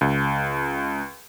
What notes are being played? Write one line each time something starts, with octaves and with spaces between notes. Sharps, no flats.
C#2